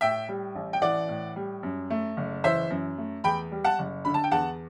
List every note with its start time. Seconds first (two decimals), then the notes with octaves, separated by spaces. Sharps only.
0.01 A2 E5 G5
0.29 G3
0.55 A1
0.73 G5
0.82 E3 D5 F#5
1.09 A2
1.36 G3
1.63 F#2
1.90 A3
2.17 F#1
2.44 E3 C5 E5
2.70 F#2
2.98 A3
3.24 E2 G5 B5
3.52 G3
3.64 F#5 A5
3.79 F#1
4.05 D3 B5
4.14 A5
4.24 G5
4.31 E2 F#5 A5